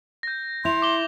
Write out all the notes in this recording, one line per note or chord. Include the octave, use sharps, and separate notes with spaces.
G6 A#6
E4 C6 G6 F7
D6 G7